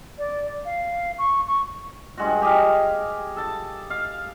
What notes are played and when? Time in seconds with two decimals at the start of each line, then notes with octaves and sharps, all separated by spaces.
0.18 D5
0.66 F5
1.19 C#6
1.47 C#6
2.18 G2 G#3 F#4
2.42 G4 G#4 D#5 F5
3.37 A4 A5
3.90 F5